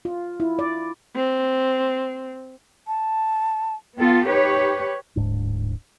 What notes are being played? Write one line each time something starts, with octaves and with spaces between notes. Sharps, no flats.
F4
E4
D5
C4
A5
B3 F4 A4 G5
D#4 G4 B4 C#5
D1 G#2 D4